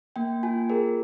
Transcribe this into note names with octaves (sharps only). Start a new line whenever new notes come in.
A#3 G5
F4 G#5
G#4 A#4